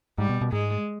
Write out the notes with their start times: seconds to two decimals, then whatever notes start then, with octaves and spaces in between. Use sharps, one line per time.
0.18 G#2 G3
0.29 B2
0.41 B2
0.53 G#2 G#3